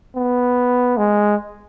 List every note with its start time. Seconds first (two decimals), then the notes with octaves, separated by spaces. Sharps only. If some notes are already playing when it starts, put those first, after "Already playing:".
0.16 B3
0.97 G#3